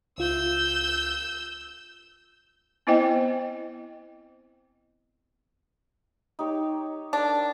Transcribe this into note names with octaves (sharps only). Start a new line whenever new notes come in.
C#2 F4 E6 G6
B3 C4 E4 C5 D#5 G5
D#4 G4 C#5
D4 A4 A#4